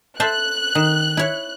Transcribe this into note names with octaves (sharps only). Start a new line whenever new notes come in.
A4 C5 E5 F#6
D#3
E4 C#5